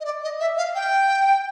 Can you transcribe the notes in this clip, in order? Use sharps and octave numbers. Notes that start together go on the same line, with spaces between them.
D#5
D5
D#5
E5
F5
G5